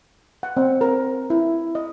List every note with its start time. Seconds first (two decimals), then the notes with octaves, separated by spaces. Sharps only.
0.43 F#5
0.57 C4
0.81 A#4
1.30 E4
1.75 D#5